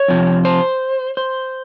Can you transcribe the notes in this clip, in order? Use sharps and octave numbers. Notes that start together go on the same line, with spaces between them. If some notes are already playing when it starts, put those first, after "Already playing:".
Already playing: C#5
F2 C3 F3
C5
C5